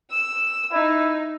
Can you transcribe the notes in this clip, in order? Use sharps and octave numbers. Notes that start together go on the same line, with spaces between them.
E6
D#4 E4